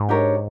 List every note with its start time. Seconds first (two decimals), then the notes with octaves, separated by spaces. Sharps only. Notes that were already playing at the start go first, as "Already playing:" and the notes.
Already playing: G#2
0.09 D4 G4 A#4 C#5